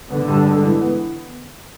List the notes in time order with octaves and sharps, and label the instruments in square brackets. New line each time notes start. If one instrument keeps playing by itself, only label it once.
[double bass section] D3 [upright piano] B3
[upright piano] G2
G#3
E3
B3